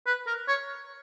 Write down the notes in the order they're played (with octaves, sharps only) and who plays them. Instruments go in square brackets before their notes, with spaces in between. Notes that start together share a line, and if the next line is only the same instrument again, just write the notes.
[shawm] B4
A#4
C#5